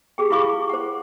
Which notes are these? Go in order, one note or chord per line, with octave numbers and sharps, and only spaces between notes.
G4 G#4 G5
E4 F4 G4 F5 C#6 D6
C5 F#5